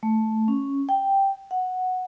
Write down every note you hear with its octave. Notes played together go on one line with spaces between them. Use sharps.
A3
C#4
G5
F#5